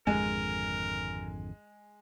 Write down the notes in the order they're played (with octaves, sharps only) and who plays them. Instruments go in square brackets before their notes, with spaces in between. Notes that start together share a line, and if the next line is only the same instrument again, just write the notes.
[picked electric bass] G#1 F2 D3 [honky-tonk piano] G#3 G#5 [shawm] A#4